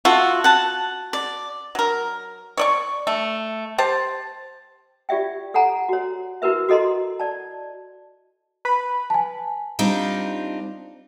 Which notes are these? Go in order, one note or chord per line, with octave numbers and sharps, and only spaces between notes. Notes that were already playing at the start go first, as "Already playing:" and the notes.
F4 F#4 A4 E5
F#5 A5
D5
F#3 A#4
C#5 D5 C#6
A3
G4 C5 A5
F4 G4 D5 E5 G5
A4 F#5 G#5 A#5
F#4 C#5
E4 F#4 A#4 B4 E5
F#4 A4 D#5 A#5 C6
D5 A5
B4 B5
G#5 A5
G3 C4 D4 D#4 F4